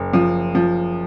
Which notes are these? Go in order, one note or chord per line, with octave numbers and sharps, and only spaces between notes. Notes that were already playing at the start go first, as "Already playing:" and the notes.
Already playing: F#1
F3
F3